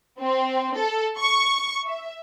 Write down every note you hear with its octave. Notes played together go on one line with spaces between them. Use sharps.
C4
A4
C#6
E5